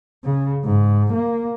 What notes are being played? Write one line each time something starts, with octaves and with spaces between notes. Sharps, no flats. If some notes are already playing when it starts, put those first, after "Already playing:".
C#3
G#2
A#3